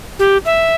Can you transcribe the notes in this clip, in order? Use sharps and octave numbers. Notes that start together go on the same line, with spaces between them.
G4
E5